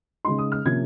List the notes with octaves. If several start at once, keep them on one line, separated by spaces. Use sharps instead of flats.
C#3 G#3 D#4 C6
D#6
F6
C3 F3 A#3 C#4 G#6